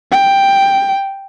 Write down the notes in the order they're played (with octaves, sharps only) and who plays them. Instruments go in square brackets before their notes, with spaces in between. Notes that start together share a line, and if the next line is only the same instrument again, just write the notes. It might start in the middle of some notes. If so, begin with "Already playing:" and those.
[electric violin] G5